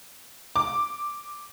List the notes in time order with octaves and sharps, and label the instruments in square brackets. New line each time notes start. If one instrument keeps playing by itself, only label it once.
[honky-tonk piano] D6